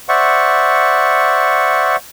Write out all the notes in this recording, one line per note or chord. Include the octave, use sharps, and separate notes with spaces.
C5 D5 E5 F#5 C#6